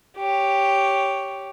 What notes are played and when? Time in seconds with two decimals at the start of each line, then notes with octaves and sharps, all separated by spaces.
0.16 G4 C#5